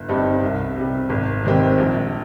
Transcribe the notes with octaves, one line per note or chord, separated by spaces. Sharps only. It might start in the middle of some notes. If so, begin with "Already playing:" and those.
Already playing: G1
G2 G3 C4 D#4
C2
C3 G3
G#1
G#2 D#3 G3 C4
A#1